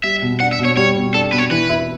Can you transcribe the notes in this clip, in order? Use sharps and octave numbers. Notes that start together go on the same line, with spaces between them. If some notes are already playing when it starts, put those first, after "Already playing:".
G3 E5
B2
D4 F#5
E5
B2
C#5
G3 C#5
B2
D4 A4
B2 B4
C#5
E3 B4
E4